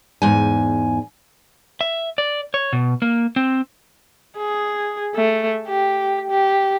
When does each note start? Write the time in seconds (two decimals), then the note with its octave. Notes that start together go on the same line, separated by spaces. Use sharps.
0.22 E2 G#2 G#5
1.81 E5
2.18 D5
2.54 C#5
2.73 B2
3.02 A#3
3.36 C4
4.38 G#4
5.16 A3
5.68 G4
6.30 G4